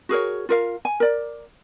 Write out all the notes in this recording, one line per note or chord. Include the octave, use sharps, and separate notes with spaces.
F#4 G#4 A#4 C#5
F4 A#4 F5
G#5
A#4 D5